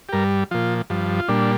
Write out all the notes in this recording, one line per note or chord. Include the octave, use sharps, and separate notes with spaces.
G4
G2 G3 A#4
A#2 F3 F4
G2 F3
F4
A#2 G3 D4